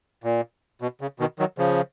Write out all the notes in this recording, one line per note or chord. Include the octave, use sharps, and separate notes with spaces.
A#2
B2
C#3
B2 D#3
D#3 F#3
C#3 F3